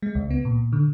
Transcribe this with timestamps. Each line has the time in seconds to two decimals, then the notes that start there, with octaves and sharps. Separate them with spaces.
0.02 G#3
0.15 C#2
0.30 B3
0.45 A#2
0.73 D3